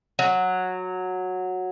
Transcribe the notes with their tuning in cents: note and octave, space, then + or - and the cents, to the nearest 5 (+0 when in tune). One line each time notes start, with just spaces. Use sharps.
F#3 -10